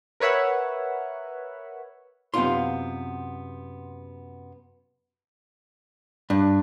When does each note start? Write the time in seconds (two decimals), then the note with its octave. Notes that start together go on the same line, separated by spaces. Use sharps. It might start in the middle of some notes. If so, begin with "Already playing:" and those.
0.20 A#4 B4 C#5 E5 F#5
2.34 F#2 C3 B3 D#4 F4 C6
6.30 G2 D4